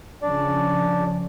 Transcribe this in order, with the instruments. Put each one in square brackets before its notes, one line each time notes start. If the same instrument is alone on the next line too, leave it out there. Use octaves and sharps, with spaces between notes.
[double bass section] C#3 F3 C#4 [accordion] D4 D5